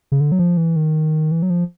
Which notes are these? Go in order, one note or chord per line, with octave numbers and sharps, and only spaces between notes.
C#3
D3
F#3
F3
E3
D#3
E3
F#3
F3